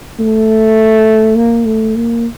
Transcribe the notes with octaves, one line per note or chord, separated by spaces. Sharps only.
A3
A#3
A3
A#3